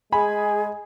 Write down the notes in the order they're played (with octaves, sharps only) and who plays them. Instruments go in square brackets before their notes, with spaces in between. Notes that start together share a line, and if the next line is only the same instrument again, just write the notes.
[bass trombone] G#3 [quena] G#4 [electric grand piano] G#5 [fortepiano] B5